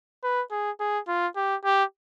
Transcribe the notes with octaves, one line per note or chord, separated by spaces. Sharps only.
B4
G#4
G#4
F4
G4
G4